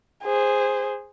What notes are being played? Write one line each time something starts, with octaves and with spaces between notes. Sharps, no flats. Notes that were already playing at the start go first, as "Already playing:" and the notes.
G#4 C5